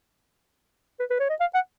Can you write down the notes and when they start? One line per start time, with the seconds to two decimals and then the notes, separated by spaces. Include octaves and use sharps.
1.00 B4
1.10 B4
1.20 C#5
1.30 D#5
1.40 F5
1.54 F#5